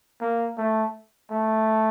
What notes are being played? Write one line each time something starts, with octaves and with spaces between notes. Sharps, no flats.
A#3
A3
A3